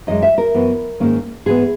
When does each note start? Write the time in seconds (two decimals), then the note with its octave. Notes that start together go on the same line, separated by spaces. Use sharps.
0.07 F#2 E3 G#3 D#5
0.23 E5
0.38 A#4
0.54 F#2 E3 B3
1.00 G#2 D#3 A#3 C#4
1.46 G#2 E3 G#3 B3 G#4